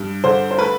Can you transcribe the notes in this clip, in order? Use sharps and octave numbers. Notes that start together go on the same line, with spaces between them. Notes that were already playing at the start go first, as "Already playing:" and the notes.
Already playing: G2
D3 C5
C5
A3 B4